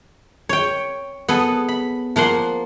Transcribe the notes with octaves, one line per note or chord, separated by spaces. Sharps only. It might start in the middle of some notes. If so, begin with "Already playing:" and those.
C#5 G5
B3 G#4 A4
B5
F3 A#3 F#5 C6